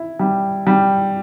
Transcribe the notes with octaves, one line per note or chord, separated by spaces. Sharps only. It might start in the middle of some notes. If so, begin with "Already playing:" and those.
Already playing: E4
G3
G3